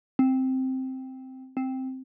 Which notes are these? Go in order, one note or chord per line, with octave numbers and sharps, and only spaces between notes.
C4
C4